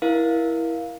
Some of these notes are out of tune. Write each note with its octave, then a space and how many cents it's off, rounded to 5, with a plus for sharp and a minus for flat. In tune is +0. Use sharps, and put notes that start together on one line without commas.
E4 +0 A#4 +25 F5 +0